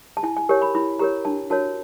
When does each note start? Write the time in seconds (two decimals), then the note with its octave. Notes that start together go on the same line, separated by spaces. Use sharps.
0.17 A5
0.23 E4 G#5
0.37 G#5
0.49 G4 A#4 C#5 G#5
0.62 B5
0.75 E4 B5
0.99 G4 A#4 C#5 A#5
1.25 D4 A5
1.50 F#4 A#4 C#5 A5